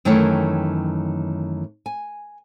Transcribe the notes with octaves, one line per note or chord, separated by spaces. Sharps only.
F#2 D#3 E3 A3 C#5 G5
G#5